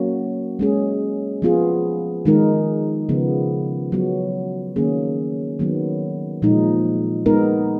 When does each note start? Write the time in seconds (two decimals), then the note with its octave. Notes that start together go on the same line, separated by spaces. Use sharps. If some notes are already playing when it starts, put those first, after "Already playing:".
Already playing: F#3 A#3 C#4 F#4
0.59 G#3 C#4 G#4
1.42 F3 B3 F4 G#4
2.25 D#3 G#3 D#4 A#4
3.09 C#3 F3 B3
3.92 F#3 B3 F#4
4.76 D#3 A#3 C#4 G#4
5.59 D#3 F#3 B3
6.42 A#2 F3 G#3 D#4
7.26 G#3 B3 D#4 A#4